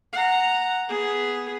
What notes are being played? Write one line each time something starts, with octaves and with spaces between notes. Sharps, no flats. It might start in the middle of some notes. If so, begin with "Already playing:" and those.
F#5 A#5
B3 G#4